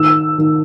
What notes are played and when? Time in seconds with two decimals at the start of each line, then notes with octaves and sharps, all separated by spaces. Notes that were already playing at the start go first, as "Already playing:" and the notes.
Already playing: D#3 E6
0.38 D#3